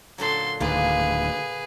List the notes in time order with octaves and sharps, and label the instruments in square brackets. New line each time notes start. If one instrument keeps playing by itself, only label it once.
[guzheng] A#2 D3 F#3 [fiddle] A4 C6
[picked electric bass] D1 D2 D#3 [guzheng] D3 A#3 F4 [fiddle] G#4 B4